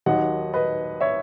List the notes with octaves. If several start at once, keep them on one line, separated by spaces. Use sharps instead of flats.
D#2 D#3 F#3 D#5 F#5
B4 D#5
C#5 E5